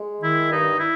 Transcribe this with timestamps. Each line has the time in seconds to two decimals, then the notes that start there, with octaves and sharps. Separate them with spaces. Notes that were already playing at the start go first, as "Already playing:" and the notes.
Already playing: G#3
0.21 D#3 E4
0.50 G2 D#4
0.78 E4